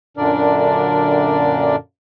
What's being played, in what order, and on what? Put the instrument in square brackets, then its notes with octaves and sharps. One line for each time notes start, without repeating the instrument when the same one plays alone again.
[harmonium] F#2 A#2 D3 D4 A#4 D5